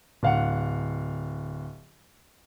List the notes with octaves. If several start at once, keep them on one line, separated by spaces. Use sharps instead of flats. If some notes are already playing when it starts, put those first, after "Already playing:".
D1 F5 F#5